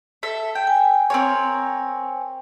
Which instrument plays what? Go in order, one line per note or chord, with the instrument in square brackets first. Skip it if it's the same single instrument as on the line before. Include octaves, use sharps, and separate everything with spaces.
[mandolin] A4 E5
G5
[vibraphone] G#5
[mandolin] C4 A#4 C#5